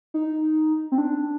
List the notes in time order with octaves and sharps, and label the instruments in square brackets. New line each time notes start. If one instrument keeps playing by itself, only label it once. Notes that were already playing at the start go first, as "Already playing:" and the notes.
[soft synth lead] D#4
C4
D4